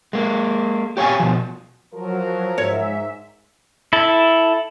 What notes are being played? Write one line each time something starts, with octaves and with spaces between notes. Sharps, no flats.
G#3 A#3
G4 C#5 F5 G#5
B2 F3
F3 F#3 A#4
G#2 C#5 E5
E4 A4